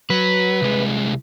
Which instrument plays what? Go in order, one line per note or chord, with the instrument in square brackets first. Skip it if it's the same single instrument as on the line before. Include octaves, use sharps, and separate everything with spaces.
[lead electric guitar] F#3 [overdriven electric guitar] B4
[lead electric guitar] C2 G#3